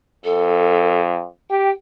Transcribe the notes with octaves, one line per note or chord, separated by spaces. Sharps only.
F2 A4
G4 G5